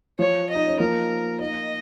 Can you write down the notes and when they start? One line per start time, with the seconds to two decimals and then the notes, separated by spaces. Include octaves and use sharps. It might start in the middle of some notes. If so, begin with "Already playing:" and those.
0.19 F3 C#5
0.50 D#5
0.55 D#4
0.68 C#4
0.80 F3 A#3 A#4
1.40 A#3 D#4 D#5